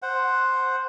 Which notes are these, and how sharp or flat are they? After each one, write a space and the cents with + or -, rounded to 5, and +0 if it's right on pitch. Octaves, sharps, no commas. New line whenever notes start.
C5 +0 F#5 +0